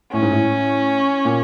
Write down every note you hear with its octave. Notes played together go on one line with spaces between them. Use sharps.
A2 C#4
G#2
A2
A#2